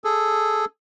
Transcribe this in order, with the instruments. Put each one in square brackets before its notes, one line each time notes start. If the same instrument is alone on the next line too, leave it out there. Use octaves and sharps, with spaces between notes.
[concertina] G#4 A4